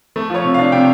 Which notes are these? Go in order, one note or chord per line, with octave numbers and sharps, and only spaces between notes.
A3
F3 C#5
C3
F5
D4
C3 G5